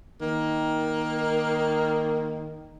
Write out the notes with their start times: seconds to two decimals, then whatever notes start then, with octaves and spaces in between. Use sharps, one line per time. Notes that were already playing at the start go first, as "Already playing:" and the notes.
0.21 D#3 A#3